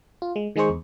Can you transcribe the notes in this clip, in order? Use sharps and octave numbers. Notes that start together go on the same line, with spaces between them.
F4
G#3
D#3 G#3 D#4 G#4 C5 C#6
E2